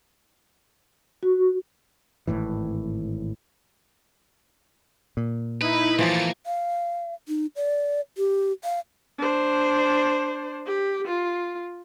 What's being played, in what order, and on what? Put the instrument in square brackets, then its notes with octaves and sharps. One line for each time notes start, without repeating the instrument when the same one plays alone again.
[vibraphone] F#4
[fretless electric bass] G#1 C#2 A2 E3
[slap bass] A#2
[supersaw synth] D#4 E4 B5 [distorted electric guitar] B4
[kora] E3 F3 [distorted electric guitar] A3 A#3 [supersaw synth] A6 C#7
[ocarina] F5
D#4
D5
G4
F5
[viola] D4 C5
G4
F4